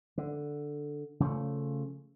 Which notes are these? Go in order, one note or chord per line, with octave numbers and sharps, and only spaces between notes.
D3
C#3 F3 A3